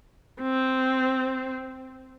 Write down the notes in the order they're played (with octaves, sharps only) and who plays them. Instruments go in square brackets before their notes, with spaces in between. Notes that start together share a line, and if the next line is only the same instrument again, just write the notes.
[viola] C4